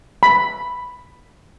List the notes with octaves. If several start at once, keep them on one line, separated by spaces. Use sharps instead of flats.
B5